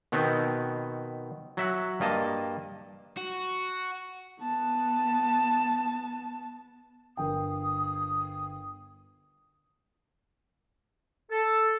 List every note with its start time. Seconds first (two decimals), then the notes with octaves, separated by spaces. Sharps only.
0.12 B2 D#3 B3 C4
1.57 F#3 E5 F#5
2.00 G2 A#3 D#5 A5
3.17 F#4
4.39 B3 A5
7.17 G1 A#4 G5 D#6
11.31 A4